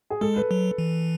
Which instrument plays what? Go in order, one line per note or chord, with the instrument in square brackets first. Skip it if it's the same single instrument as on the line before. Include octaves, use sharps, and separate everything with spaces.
[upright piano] G#4
[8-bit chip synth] G#3 [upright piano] A4
[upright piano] B4
[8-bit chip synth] F#3
E3